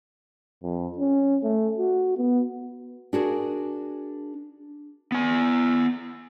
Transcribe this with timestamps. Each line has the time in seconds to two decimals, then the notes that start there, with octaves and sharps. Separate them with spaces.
0.63 F2
0.98 C#4
1.43 A3
1.78 F#4
2.18 B3
3.13 D4 F#4 G#4 A#4
5.12 B3 G#5